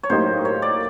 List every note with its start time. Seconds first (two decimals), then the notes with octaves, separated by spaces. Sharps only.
0.03 C#5
0.10 A2 F#3 A#3 D#4 G4 C5
0.45 C#5
0.62 D5